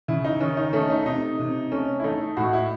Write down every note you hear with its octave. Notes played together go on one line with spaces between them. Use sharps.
C#3 E4
D#4
D#3 C#4
D#4
A3 C#4
D#4
C3 D#4
C3
A3 C#4
E4
A3 D#4
A2 F#4
E4